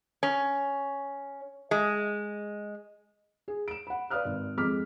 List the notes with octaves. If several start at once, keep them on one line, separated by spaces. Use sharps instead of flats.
C#4
G#3
G#4
D7 E7
F#5 B5
B4 D5 F5 D#6 F6 F#6
G#1
F2 G#3 D6 F6 B6